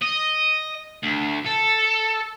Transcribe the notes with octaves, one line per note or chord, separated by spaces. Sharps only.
D#5
D2
A4